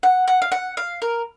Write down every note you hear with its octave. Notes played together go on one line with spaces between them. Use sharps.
F#5
F#5
F5
F#5
F5
A#4